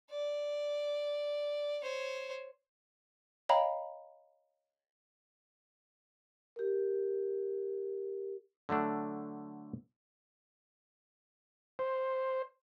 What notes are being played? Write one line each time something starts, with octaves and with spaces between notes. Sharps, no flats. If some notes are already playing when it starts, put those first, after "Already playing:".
D5
C5 C#5
C#5 D#5 F5 G5 A#5 B5
G4 A#4
D3 F#3 A3 D4
C5